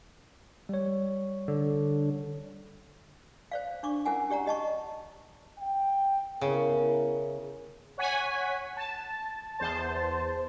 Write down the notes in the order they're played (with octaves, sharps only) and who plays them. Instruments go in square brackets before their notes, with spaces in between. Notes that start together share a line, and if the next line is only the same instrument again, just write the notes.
[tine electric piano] G3 C#5
[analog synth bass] D3
[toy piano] C5 D5 F5
D4 C#6 D6
C#4 E4 A#4 F#5 G#5
G4 D5 F#5 A#5
G4 D#5 A5 C#6
[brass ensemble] G5
[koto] C#3 [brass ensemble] B3 E4 A#4
[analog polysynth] C#5 F#5 G#5 B6
A5
E2 C5 A5